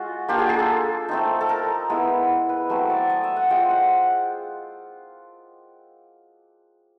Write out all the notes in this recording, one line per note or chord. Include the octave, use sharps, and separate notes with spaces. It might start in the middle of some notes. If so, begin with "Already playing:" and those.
Already playing: G#3 C#4 F4 F#4
A#3 D4 F4 G4
G#4
G#4
A4
A3 C4 D#4
A4
A#4
G#3 B3 E4
B4
F#3 A3 C4
D5
D#5
E5
F#5
G#3 C4 F4 G5
F#5